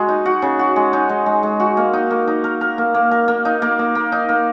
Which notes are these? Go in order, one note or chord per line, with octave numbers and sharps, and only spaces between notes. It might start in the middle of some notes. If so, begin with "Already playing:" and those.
Already playing: G#3 F#4
D#4
F#4
C#3
F#4
G#3
D#4
G#3
G#3
G#3
F#4
A#3
D#4
A#3
D#4
A#4
A#4
A#3
A#3
A#4
A#3
D#4
A#3
A#3
A#3
D#4
A#3